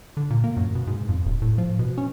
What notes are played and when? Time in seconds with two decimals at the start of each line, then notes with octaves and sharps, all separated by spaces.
0.17 D3
0.30 A#2
0.44 A#3
0.57 F#2
0.75 B2
0.87 G#2
1.09 F2
1.25 D1
1.42 A2
1.58 F3
1.79 B2
1.98 C#4